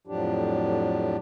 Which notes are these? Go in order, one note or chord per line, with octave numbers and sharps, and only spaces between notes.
F2 A2 F3 F#3 D4 G4